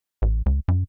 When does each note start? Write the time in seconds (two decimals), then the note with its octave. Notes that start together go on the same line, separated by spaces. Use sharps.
0.22 A1
0.46 C#2
0.68 F#2